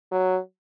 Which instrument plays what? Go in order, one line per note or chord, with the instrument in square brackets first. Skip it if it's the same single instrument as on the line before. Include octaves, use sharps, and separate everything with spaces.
[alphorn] F#3